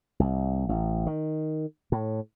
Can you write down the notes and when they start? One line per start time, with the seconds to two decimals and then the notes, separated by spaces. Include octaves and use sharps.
0.20 C2
0.69 A1
1.07 D#3
1.92 A2